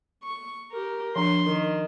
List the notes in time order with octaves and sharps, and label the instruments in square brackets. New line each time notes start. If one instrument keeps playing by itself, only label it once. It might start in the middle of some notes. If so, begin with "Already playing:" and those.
[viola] C#6
G4 A#4
[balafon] F3 D4 [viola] C6
[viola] D#3